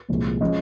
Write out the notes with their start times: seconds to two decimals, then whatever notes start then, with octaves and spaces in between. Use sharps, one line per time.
0.09 C2 A#2 F3 G#3
0.41 F3 G#3 C#4 D#5